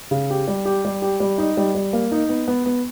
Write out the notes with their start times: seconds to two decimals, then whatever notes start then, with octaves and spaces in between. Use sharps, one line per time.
0.11 C#3
0.30 G4
0.48 G3
0.65 G4
0.85 G3
1.02 G4
1.20 G3
1.38 D#4
1.57 G3
1.75 G3
1.93 A#3
2.11 D#4
2.29 B3
2.48 B3
2.66 B3